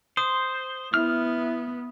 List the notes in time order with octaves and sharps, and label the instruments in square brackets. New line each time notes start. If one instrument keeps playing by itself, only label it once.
[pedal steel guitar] C5 [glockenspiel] D#6
[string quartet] B3 [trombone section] E4 [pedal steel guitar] F6